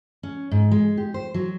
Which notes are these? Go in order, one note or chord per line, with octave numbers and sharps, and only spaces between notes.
C#4
G#2
G#3
G4
C5
F#3